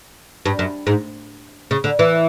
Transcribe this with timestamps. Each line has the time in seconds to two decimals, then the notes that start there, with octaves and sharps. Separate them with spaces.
0.46 G2
0.59 F#2
0.87 G#2
1.71 C#3
1.84 D3
1.99 E3